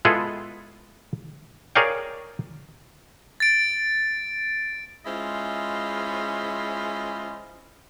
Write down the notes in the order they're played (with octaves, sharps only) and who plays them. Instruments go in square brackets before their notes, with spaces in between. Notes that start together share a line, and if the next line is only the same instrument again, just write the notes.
[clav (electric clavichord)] G#3 B3 E4 F4 G#4 A4
G#4 A#4 C#5 D5 F5 G5
[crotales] A6 D7
[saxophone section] G#3 C#4 E4 F4 C5 D#5